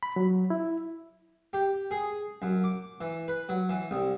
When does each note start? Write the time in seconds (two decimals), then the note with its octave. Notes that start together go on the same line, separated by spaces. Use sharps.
0.03 B5
0.16 F#3
0.50 E4
1.53 G4
1.91 G#4
2.42 F#2
2.64 D6
3.01 E3
3.28 B4
3.49 F#3
3.69 E3
3.91 C2